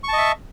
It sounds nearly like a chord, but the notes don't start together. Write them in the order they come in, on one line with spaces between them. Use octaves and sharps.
C#6 A5 D#5 E5